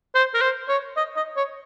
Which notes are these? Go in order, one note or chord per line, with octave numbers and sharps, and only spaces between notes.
C5
A#4
C5
C#5
D#5
D#5
C#5